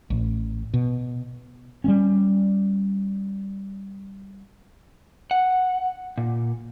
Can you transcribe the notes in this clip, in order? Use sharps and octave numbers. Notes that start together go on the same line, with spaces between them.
A1
B2
G3 A3 C#4
F#5
A#2